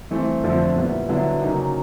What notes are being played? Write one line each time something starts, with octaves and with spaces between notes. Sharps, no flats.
G2 E3 A3 C4
F2 D3 F3 A3 C4
A#2 G3 B3 E4
G2 D3 F#3 B3 E4
C#3 F#3 A#3 D#4 G4